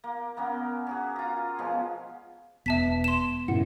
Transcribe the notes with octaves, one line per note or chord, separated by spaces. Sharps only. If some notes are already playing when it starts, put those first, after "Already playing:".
A#3
A#3 B3 C#4 A#4
C#4 F#4 G#4
F4 A#5
B2 F3 G#3 C#4
E1 B3 E5 A5 B6
C6 E7
G2 A#2 C#3 E4 F#5